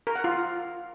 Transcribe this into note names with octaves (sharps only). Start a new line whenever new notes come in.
A#4
F#5
F4